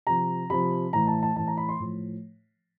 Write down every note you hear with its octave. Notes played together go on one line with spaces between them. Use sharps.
C3 F3 A#5
C3 F3 B5
A2 E3 A#5
A5
A5
A2 E3 A5
A#5
B5
C6
A2 F3